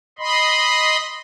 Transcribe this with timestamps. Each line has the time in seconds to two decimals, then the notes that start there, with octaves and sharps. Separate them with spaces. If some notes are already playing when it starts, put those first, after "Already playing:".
0.19 D#5 B5 C6